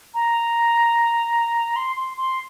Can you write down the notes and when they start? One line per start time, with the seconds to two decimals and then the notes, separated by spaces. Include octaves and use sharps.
0.14 A#5
1.76 C6
1.96 C6
2.17 C6